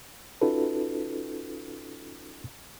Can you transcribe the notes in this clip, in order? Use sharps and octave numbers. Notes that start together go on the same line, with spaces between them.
C#4 D#4 F4 F#4 A4 B4